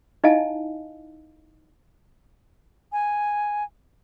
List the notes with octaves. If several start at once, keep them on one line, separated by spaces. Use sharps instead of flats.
D#4 E4 D#5 F5 G#5 A5
G#5